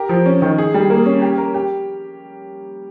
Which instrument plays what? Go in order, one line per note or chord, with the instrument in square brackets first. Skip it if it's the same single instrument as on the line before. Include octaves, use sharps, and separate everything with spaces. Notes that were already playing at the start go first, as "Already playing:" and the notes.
Already playing: [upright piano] G4 A#4
F3
C#4
D#3
G#4
G3
A#3
C#4
G4
A#4
G4